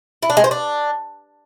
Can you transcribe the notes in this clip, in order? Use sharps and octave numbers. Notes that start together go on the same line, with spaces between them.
E4
D4
G#3
C5
D4